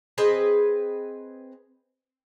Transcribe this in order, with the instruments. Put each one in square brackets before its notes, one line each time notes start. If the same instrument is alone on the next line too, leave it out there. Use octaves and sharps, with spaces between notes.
[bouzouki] C4 G#4 B4 D#5